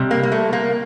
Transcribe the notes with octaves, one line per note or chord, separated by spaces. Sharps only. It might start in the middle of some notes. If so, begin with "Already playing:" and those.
Already playing: C3 G3
A#3
A#3
A3
A#3